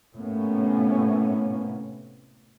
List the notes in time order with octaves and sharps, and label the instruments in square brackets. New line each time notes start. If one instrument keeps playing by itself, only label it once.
[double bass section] A2 C3 A#3 B3 C#4